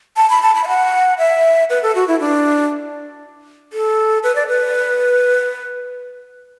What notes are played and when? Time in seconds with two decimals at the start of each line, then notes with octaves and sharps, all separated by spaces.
0.17 A5
0.30 B5
0.43 A5
0.55 B5
0.64 E5
0.68 F#5
1.18 E5
1.70 B4
1.83 A4
1.95 F#4
2.08 E4
2.20 D4
3.73 A4
4.23 B4
4.35 D5
4.48 B4